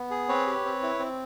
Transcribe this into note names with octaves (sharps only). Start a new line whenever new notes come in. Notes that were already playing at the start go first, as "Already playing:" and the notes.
Already playing: B3
G#4
C4 B4 C#5
G4
C4
E4
C4